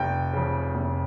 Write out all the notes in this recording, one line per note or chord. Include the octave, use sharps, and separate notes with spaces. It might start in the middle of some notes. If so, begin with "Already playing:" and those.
Already playing: F1 G5
F2 C#3
F1